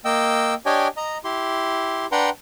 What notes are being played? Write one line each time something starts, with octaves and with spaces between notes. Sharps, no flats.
A#3 D#5 G5 E6
D4 G4 C#5 D#5 G5 G#5
D#5 A#5
E4 G4 C6
D4 B4 F#5 G5 A#5 C6